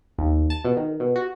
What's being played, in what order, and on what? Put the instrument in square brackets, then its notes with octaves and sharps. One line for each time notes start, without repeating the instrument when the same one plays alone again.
[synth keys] D#2
A5
B2
D#3
B2
F#4